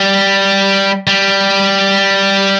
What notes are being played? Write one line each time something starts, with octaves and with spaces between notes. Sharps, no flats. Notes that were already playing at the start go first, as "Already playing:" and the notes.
Already playing: G3
G3